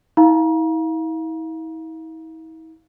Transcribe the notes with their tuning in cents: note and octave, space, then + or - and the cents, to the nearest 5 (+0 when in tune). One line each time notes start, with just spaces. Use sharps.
E4 -45 F5 +0 A#5 +35